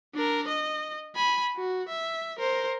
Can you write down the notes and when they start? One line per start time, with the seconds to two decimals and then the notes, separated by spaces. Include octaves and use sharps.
0.14 D4 A#4
0.48 D#5
1.16 G#5 B5
1.56 F#4
1.89 E5
2.39 A#4 C5